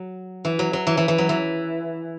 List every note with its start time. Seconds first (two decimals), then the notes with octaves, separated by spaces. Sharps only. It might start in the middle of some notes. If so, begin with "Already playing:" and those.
Already playing: F#3
0.45 E3
0.59 F#3
0.73 F#3
0.87 E3
0.97 E3
1.08 E3
1.18 F#3
1.29 E3